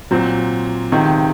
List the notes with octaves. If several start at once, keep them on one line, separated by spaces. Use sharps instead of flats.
A#2 F#3 C4
C#2 C3 D#3